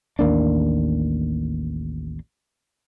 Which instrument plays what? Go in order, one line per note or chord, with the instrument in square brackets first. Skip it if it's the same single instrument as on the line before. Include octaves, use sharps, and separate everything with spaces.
[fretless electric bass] A1 D#2 A#3 D4